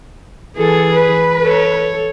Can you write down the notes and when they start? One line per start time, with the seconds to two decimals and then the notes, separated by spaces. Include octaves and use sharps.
0.57 E3 G#4 A4
0.93 B4
1.42 A4 C#5